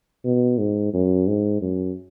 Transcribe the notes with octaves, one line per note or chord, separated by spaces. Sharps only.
B2
G#2
F#2
G#2
F#2